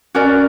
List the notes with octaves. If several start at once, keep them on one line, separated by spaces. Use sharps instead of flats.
C#4 F#4 A#4 D5